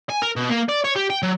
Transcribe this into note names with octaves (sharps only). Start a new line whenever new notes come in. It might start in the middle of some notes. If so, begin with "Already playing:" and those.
G#5
A#4
B2
A#3
D5
C#5
G4
G5
F#3